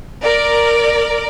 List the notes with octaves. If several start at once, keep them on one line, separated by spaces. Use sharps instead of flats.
A#4 D5